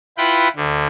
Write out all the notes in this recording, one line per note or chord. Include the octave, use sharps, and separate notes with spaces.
E4 F4 B4 F#5 G5 B5
D2 D3